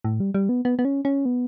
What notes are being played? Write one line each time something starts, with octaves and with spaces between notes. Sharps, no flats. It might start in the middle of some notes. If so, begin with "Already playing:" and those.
A2
G3
G3
B3
B3
B3
C#4
C#4
B3